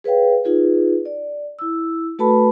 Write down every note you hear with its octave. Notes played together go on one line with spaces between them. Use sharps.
G#4 B4 C#5 F5 G5
D#4 F4 G#4 B4
D5
E4 E6
A3 F#4 A4 B4 A5 B5